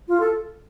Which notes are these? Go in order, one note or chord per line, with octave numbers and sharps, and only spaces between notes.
F4
A4